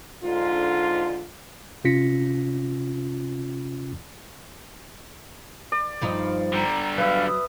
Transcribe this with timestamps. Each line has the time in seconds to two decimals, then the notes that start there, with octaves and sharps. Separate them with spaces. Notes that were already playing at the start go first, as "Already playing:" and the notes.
0.24 G#2 D3 F4
1.84 C3 C#4 F4 A#6 B6 C#7
5.72 D5
6.01 G2 F3 D#4
6.54 D3 G3 A#5
6.98 F#3 B4 E5 F5
7.27 D#6